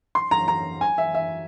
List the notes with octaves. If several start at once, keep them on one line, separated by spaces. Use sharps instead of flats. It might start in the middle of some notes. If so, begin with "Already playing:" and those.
C6
A#5
A#5
G#5
E5
E5